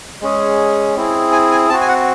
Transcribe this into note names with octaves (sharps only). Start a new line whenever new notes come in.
G#3 C#4 G#4
C4 E4 G#4
G#5
G#5
C4 F#4 A5
G#5
F#5